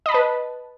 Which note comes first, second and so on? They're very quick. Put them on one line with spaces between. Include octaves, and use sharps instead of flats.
D#5 B5 A5 B4